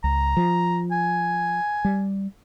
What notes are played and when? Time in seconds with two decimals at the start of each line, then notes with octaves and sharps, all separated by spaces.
0.04 C#2 A#5
0.37 F3
0.91 G#5
1.85 G3